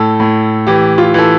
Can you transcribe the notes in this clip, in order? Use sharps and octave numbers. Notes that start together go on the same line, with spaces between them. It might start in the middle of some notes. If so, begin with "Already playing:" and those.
Already playing: A2 A4
A2
E3 G4
F4
E3 A4